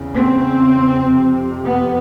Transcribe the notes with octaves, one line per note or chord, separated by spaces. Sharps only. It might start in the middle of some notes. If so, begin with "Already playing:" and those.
Already playing: E2 C#3
C4
F2 C3
B3